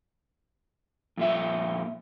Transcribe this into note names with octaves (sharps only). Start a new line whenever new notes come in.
F2 A#2 E5